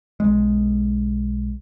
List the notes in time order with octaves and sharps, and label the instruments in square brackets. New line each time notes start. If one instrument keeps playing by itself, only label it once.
[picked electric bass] B1 G#3